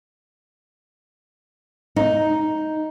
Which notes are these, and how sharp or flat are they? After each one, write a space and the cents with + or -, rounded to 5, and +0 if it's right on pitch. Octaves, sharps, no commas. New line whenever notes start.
D#4 +5